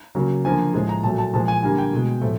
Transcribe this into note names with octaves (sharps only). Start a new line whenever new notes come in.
C#3 F#3 A#3
D3 F3 A#3 G#5
A2 F3 G#3
A#5
A#2 F#3 A3 A5
A5
A#2 F3 G#3 A5
G#5
D3 G3 A#3 G#5
G5
B2 G#3
A2 F3 A3